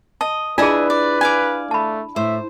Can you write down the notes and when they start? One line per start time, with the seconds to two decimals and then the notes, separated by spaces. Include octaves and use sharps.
0.21 D#5 A5
0.58 D4 E4 F4 G#4 B4 D#5 E5 G#5
0.90 D5
1.21 D5 F5 G#5
1.71 A3 A5 B5
2.16 A2 C5 E5